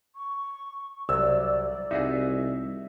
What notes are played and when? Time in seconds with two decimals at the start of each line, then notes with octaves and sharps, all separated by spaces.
0.16 C#6
1.09 C2 F#3 D5 E6
1.91 C2 D#4 F#4 G#4 E5